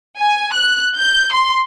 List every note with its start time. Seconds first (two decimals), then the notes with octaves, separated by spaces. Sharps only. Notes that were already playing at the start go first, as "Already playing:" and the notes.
0.19 G#5
0.53 F#6
0.95 G6
1.33 C6